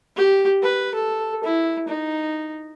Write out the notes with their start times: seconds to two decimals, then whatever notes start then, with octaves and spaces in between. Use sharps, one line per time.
0.16 G4
0.62 B4
0.94 A4
1.44 E4
1.88 D#4